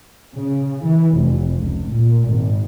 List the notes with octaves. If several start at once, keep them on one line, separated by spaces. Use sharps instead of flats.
C#3
E3
F1
C#2
A#2
G#1